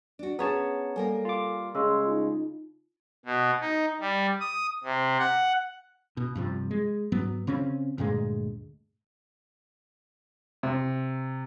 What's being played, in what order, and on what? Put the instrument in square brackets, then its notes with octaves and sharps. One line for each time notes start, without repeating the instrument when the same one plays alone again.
[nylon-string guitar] D4 F#4
[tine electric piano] B3 C#5 A5 [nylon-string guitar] C#4 G#4 [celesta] A#5
[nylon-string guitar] G3 A#3 A#4 [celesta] A4 G#5
[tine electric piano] F4 D6
[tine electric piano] C#3 G#3 [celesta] C6 C#6 E6
[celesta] D#4 F4
[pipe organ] B2
D#4
G3
D#6
C3
F#5
[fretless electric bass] B2
G2 C3 F3
G#3
G#2 F#3 B3
C#3 C4 C#4
D2 G2 A#2 G#3
[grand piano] C3